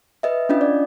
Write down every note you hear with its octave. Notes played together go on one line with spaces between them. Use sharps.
B4 D#5 E5
C#4 D4 F4 D#5
D5